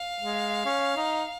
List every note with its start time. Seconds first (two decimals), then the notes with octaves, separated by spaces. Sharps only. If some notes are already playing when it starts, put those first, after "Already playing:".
Already playing: F5
0.20 G#3
0.65 C#4
0.96 D#4